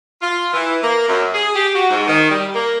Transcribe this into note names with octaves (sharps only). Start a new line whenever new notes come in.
F4
E3
A#3
F#2
G#4
G4
F#4
G#2
D#3
G3
A#3